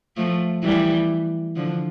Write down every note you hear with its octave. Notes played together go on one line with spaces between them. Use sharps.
F3 A3
E3 G3
D3 F3